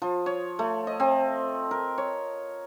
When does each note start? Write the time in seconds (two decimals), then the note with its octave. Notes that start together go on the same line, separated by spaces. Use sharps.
0.02 F3
0.26 C#5
0.59 A3
0.87 D#5
1.00 C4
1.71 A#4
1.98 C#5